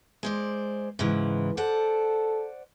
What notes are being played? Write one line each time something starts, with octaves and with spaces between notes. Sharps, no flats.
G#3 C5 D5
G#2 C#3 E3
A4 C5 D5 F#5